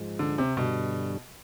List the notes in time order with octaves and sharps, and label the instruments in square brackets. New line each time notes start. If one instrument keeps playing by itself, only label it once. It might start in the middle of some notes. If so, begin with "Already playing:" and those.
Already playing: [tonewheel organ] G#2 F3 G#3
[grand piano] D3
C3
[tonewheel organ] G2 D3 G3 [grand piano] B2